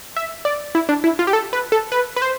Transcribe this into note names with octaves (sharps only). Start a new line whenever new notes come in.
E5
D5
E4
D4
E4
F4
G4
A4
B4
A4
B4
B4
C5